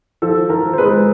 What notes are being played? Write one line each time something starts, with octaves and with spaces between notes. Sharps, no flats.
F3 A4
F3 A#4
C5
G#3 B4